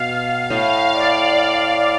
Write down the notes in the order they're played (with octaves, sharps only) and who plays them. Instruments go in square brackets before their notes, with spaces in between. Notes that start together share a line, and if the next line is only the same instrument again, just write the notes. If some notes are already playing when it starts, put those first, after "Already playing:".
Already playing: [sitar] B2 [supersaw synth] F5
[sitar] A2 [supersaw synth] F5
[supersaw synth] D5
F5